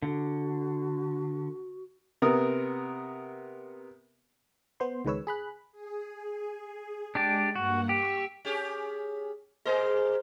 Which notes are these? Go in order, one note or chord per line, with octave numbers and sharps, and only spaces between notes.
D3 F#4
C3 B3 A#4 D#6
B3 C5 C6
C#2 D#3 G#3 B4 C#5 E6
G#4 B5 F#6
G#4
G#3 D4 G4 D5
G2 A#3 F#4 F#5
G4 C#6 E6
C#4 G4 G#4
B2 G#4 A#4 C5 D#5